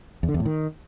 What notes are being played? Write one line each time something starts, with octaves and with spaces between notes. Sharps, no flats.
E2
D3
E2
A2
D#3